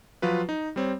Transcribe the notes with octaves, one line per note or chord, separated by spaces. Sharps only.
F3 F#3 F4 B4
D#4
G3 C4 C#5